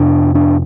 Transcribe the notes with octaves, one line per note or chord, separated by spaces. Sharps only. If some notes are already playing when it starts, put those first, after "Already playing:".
Already playing: F2 C3 D4
D4